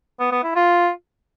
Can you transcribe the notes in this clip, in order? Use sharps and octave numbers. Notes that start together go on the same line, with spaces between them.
B3
B3
E4
F4